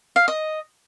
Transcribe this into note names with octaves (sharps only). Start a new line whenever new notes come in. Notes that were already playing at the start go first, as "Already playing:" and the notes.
F5
D#5